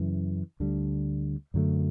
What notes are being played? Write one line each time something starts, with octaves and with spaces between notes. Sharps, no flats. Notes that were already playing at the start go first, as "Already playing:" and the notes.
Already playing: F#2 C#3 E3
D2 D3 G3
F#2 D3 F#3 A3